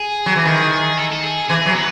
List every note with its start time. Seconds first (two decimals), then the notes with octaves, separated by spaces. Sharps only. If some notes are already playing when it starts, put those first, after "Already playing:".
Already playing: G#4
0.26 F#3
0.36 E3
0.46 D#3 G#4
0.71 G#4
0.97 A4
1.12 A4
1.24 G#4
1.49 E3 G#4
1.66 F#3
1.75 B3